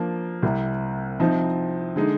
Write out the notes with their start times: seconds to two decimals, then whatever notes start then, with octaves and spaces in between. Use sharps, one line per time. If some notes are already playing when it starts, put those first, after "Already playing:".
Already playing: F3 A#3 D4
0.43 C2 C3 G3
1.19 C3 F3 C4 D#4
1.96 D3 G#3 D#4